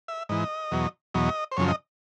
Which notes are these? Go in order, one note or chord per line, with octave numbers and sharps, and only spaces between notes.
E5
G#2 E3 D#5
E2 B2 F#3
E2 B2 F#3 D#5
C5
F#2 C#3 F3 C#5
D#5